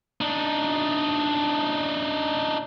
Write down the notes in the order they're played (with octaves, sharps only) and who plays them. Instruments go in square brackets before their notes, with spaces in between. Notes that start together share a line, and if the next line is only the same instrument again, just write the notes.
[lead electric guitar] D4 D#4